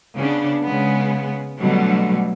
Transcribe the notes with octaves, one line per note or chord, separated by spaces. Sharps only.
C#3 B3 D4
C#3 G#3 B3
B2 D3 F#3 G3 A3